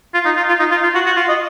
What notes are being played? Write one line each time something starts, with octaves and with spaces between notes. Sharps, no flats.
F4
D#4
F4
F4
D#4
F4
F4
F#4
F#4
F4
D#5